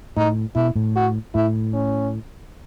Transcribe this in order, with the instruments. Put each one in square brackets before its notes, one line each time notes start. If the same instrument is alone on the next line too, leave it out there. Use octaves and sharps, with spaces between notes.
[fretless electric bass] A2 [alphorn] D#4
[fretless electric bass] B2 [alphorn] E4
[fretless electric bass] A2
[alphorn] F#4
[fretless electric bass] A2 [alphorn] E4
[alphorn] C#4